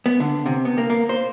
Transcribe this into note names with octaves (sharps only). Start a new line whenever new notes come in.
B3
D3
C3
B3
A#3
A#3
C5